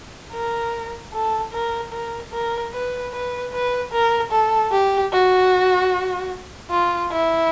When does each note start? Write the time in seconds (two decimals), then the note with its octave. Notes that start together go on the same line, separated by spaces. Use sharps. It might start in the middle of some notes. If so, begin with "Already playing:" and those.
0.33 A#4
1.13 A4
1.53 A#4
1.92 A#4
2.32 A#4
2.73 B4
3.13 B4
3.53 B4
3.92 A#4
4.31 A4
4.72 G4
5.12 F#4
6.71 F4
7.12 E4